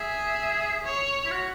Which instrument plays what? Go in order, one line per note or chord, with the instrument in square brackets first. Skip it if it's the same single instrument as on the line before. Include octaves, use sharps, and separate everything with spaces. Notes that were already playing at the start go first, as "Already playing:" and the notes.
Already playing: [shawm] G#4 [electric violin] E5
[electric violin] C#5
[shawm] E4
F#4